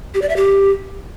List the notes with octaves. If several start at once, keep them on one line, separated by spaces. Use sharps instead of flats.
G4
D5
E5
G4